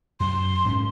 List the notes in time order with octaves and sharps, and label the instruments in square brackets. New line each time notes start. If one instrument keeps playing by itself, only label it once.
[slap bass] F#2 [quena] C6
[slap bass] G#2 C4 C#4